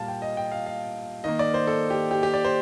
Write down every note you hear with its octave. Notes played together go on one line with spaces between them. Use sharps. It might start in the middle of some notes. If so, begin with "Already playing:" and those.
Already playing: A#2 G3 A#3 F5 A5
G5
D#5
G5
F5
F5
D#3 A#3 D#5
D5
C5
A4
G4
G4
G4
D5
C5